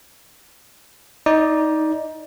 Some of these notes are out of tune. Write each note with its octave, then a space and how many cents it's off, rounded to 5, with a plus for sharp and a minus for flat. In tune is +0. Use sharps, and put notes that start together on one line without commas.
D#4 +15 D5 +0